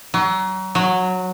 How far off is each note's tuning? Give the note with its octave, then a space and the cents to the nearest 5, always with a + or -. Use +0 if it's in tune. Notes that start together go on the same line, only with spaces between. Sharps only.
F#3 +35
F#3 -10